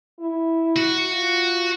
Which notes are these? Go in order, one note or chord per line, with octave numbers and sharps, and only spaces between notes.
E4
F#4
F4